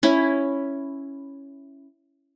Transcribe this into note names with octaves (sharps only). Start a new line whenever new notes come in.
C#4 E4